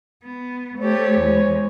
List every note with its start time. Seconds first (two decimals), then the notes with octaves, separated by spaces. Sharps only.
0.24 B3
0.79 A3 G4 C5 C#5
1.20 E2 G#3